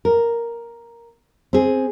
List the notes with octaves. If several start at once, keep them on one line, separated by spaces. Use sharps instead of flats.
A#4
C4 G#4